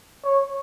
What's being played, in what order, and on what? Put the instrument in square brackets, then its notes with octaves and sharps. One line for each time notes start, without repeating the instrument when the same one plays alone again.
[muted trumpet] C#5